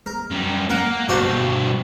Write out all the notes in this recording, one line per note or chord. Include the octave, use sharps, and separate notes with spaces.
A#4
F#2 G3
A#3 A#4 F#5
G2 B2 D4 F#4 C5